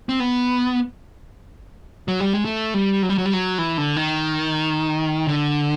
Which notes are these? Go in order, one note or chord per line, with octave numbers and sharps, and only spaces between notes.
C4
B3
F#3
G3
G#3
A3
G3
F#3
G3
F#3
G3
F#3
E3
D3
D#3
D3